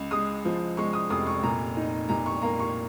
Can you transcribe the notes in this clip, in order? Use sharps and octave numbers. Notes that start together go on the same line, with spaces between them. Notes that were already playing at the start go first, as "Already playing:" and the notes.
Already playing: C#2
G#3 D#6
F3
G#3 C#6
D#6
F1 D#6
C#6
A#2 A#5
D#4
A#2 A#5
C#6
A#3 A#5
C#6